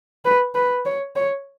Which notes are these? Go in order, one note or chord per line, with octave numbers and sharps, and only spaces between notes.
B4
B4
C#5
C#5